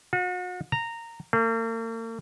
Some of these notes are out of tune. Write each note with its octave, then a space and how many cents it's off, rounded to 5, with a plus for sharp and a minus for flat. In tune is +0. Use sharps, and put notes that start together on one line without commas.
F#4 -40
A#5 -15
A#3 -45